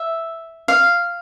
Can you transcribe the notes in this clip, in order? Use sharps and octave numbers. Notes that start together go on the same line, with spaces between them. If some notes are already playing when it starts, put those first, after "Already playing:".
Already playing: E5
F5